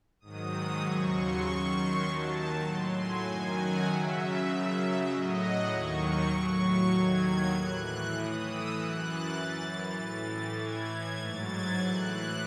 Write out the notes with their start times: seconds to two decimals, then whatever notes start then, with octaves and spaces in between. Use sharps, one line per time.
0.20 G#2 D#3 F#3 D#6
0.81 D#2 C#3 F#3 C#6
1.13 C6
1.43 F#2 D#3 F#3 C#6
1.73 C6
2.03 D#2 D#3 F#3 A5
2.64 A2 F#3 C6
2.95 G#5
3.25 F#2 D#3 F#3 G#5
3.56 F#5
3.86 F#2 C#3 F#3 E5
4.46 F#2 C#3 F#3
5.07 A2 F#3 D#5
5.38 F#5
5.68 D#2 D#3 F#3 C#6
6.30 A2 F#3
6.90 D#2 D#3 F#3 G#6
7.51 A2 E3 F#6
8.12 A2 E3 D#6
8.42 E6
8.73 F#2 E3 F#6
9.03 A6
9.34 F#2 E3
9.94 A2 E3
10.55 A2 E3 G#6
10.86 G#6
11.16 G#2 F#3 A6
11.47 G#6
11.77 A2 E3 F#6